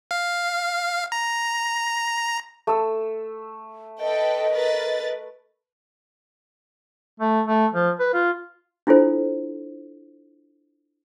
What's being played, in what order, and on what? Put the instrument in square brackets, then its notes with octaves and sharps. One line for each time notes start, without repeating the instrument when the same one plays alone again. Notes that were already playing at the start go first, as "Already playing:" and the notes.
[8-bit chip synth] F5
A#5
[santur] A3 E6
[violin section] A4 B4 G5 [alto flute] D#5
[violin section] A#4 B4 A6
[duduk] A3
A3
F3
B4
F4
[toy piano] D4 E4 F4 A4 C5